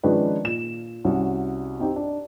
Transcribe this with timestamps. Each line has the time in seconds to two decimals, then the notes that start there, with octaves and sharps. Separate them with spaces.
0.03 D#3 F3 G#3 C#4 D4 B4
0.43 A#2 E7
1.05 C2 C#4 F#4
1.80 C4 D#4 G4
1.96 D4